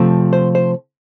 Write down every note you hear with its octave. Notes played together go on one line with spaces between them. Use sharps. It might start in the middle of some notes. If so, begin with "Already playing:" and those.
Already playing: C3 F3 A3 C4
C5
C5